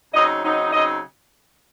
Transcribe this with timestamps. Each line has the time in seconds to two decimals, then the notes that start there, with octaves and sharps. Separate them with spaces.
0.14 C#3 F#3 C4 D#4 D#5
0.44 C#3 F#3 C4 D#4
0.73 C#3 F#3 C4 D#4 D#5